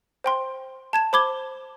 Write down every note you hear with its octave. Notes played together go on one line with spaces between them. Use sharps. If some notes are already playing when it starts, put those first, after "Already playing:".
C5 G5 C6
A5 G#6 E7
C5 B5 D6 G#6 G7